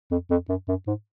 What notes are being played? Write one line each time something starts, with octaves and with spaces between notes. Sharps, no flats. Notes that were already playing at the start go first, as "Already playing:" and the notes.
F2
F2
F#2
F#2
G#2